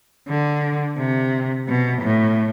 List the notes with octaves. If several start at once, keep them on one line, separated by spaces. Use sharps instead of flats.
D3
C3
B2
A2